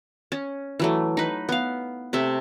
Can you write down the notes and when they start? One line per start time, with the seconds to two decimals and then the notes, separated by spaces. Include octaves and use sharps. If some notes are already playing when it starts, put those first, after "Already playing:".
0.32 C#4
0.80 E3 F#3 A3
1.17 D#4 B4
1.49 B3 F5
2.13 C3 A3 E5